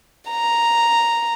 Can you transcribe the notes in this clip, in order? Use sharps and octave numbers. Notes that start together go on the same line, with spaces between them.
A#5